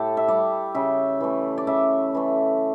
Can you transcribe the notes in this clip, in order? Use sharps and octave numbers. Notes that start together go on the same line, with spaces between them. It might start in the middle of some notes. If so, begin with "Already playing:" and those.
Already playing: A2 G4 A4
E5
G3 D5
C#3 E5
E3 A3
D5
C#3 E5
E3 A3